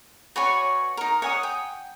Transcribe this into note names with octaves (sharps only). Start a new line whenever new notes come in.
F#4 B4 C#5 D5 G#5 C#6
D#4 A#4
C#5 F#5 G#5 D#6
G5